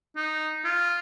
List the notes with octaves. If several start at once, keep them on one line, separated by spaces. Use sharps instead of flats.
D#4
F4